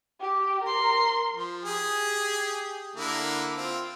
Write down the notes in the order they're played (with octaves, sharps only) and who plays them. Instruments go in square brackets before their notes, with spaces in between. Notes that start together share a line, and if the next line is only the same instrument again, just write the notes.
[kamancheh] G4
A#4 C6
[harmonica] F3
G4 G#4
D3 A#3 E4
C4 F4